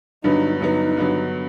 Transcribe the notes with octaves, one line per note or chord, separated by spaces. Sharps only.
G2 D3 F#3 B3 D#4
G2 D3 F#3 B3 D#4
G2 D3 F#3 B3